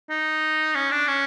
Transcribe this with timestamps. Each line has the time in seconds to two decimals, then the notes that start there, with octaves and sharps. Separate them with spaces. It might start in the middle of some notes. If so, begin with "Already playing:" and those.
0.10 D#4
0.75 C#4
0.91 D4
1.08 C#4